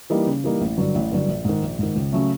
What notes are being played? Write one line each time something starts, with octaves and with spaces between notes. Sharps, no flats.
E3 G3 A#3 D#4
C#3
E3 G3 A#3 D#4
A1
G2 D3 F#3
A1
G2 D3 F#3
A#1
G#2 D#3
A#1
G#2 D#3
C#2
C#3 F#3 A3 C#4